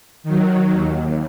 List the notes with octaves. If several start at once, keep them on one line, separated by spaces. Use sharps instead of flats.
D#3 F#3
D#2